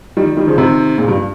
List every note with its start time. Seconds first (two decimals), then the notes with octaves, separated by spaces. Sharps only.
0.17 D#3 G3
0.37 D#3 G3
0.47 C#3 F3
0.58 C3 D#3
0.98 A#2 C#3
1.08 G2